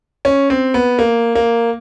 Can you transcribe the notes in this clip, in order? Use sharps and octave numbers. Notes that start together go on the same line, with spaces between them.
C#4
C4
B3
A#3
A#3